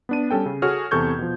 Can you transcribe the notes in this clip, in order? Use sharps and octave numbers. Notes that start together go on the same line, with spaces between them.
B3 D4 D#7
G3 C#4 A4 G5
C#3
F#4 G#4 A4 C#5 F6
E2 C3 A4 C#6 G6 G#6
B2 F3